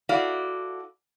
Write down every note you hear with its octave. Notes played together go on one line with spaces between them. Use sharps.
E4 F#4 A4 D5 F5